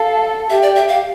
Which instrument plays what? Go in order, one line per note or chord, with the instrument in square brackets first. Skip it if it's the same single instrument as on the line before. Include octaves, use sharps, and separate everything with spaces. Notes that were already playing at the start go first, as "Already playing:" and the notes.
Already playing: [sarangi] A4 [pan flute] F5
[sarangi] G4 [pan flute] E5
[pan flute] D5
E5
F5